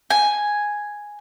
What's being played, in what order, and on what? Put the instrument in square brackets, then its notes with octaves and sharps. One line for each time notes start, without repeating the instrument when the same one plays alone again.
[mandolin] G#5